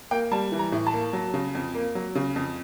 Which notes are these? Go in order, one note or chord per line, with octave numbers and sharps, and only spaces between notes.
A#3 G5
G3 A5
E3
A#5
A2
A5
A#3
F#3
C#3
F2
A#3
F#3
C#3
F2